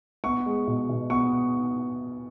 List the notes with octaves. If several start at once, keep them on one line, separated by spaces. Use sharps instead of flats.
B3 C#6
G#3
B2
B2
B3 C#6